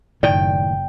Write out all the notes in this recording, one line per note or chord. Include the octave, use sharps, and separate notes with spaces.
F#1 A2 D#3 D5 G5